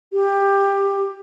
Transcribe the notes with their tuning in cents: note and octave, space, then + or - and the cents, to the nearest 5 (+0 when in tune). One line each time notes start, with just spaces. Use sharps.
G4 +15